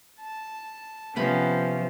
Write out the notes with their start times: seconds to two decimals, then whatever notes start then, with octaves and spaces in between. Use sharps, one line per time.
0.20 A5
1.16 C3 F3 B3 C#4 B5